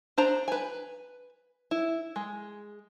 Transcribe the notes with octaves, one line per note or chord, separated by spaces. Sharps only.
D4 C5 A#5
B4 G#5
E4
G#3